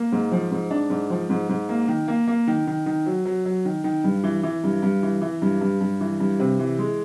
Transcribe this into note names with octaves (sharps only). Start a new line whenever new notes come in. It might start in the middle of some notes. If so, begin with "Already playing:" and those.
Already playing: A#3
G#2
F3
G#2
D4
G#2
F3
G#2
G#2
A#3
D#3
A#3
A#3
D#3
D#3
D#3
F#3
F#3
F#3
D#3
D#3
G2
E3
E3
G2
G2
E3
E3
G2
G2
G2
E3
G2
C3
E3
G#3